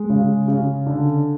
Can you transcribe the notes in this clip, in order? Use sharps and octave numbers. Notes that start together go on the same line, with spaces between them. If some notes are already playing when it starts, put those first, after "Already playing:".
Already playing: G#3
C#3
C#3
D3